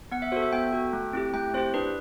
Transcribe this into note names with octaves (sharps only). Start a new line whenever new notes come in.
B3 F#5
E5
F#4 A4 C5
E5
B3 G5
F#4 A4
A3
C4 E4 G4
A3 G5
C4 E4 G4 C5
D4 B4